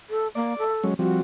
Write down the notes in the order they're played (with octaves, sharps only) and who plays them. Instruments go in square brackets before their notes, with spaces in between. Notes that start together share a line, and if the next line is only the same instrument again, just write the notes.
[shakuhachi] A4
[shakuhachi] A#3 [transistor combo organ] D5
[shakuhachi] A4
[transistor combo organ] F#3 G#3 C#4
[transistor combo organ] F3 G3 C4 [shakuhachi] F#4